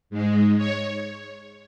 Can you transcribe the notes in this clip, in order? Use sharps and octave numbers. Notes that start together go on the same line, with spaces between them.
G#2 G#3
C#5